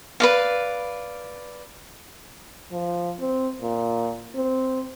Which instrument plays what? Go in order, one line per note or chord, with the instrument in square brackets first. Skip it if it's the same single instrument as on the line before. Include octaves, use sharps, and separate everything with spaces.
[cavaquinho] B4 D5 F5
[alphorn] F3
C4
A#2
C4